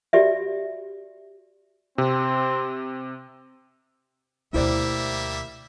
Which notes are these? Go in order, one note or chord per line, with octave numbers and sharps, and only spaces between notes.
F#4 G4 D5 E5
C3 C4
D2 B2 G3 A#3 E4 C5 D5 E5